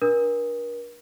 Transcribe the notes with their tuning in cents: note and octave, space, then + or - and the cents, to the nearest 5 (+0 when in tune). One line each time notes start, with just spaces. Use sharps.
D4 +0 A#4 +40 D#6 +0